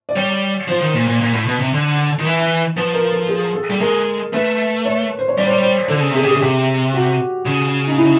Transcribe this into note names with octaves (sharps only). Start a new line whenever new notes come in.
D5
G3 C#5
F3 C5
D#3
A#2
A#2
A#2
A2
B2
C3
D3
D#3
E3
F3 B4
A#4
A4
G#4
A4
G3
G#3 A#4
A3 B4
C#5
C5
C#5
G3 D5
C5
C#5
C5
D3 A4
C#3
C3 G#4
C#3 G4
G#4
C3 G4
F#4
C#3
D#4
E4